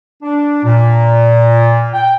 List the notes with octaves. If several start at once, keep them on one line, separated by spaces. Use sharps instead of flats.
D4
A#2
G5